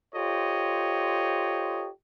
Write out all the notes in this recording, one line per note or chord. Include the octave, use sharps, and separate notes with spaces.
F4 G4 A4 C5 C#5 D#5